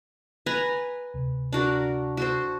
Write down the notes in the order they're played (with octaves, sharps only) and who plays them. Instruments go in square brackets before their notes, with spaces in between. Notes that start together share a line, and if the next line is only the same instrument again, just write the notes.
[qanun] B4 G#5 A#5
[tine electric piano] D2 C3
[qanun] D4 F#4 A#4
F#4 A4 C5